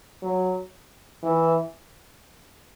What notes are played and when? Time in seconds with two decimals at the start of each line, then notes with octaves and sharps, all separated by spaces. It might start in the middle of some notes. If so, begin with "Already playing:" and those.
0.23 F#3
1.23 E3